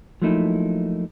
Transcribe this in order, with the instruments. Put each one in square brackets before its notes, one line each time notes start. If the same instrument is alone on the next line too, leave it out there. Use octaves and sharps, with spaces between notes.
[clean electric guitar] F3 F#3 A3 A#3 D#4 E4